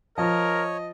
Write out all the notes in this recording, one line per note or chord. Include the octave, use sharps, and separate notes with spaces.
F3 A#4 C#5 D#5